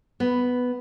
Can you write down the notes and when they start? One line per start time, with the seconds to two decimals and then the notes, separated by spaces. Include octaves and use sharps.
0.20 B3